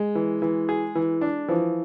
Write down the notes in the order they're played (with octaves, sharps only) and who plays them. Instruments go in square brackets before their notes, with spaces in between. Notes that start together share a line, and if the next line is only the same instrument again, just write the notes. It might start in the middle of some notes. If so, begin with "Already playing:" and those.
Already playing: [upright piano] G#3
[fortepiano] E3
E3
G#4
E3
D4
[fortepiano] E3 [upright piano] F3